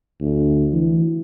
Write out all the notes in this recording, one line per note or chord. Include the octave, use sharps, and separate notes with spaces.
D2
E3